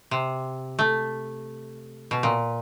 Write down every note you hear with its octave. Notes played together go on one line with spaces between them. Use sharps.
C3
A3
B2
A#2